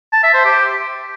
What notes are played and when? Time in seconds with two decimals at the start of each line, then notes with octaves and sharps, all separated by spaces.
0.13 A5
0.23 E5
0.34 C5
0.45 G4